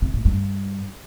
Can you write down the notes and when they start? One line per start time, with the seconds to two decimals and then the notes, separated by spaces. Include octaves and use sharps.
0.02 C3
0.13 A2
0.25 G2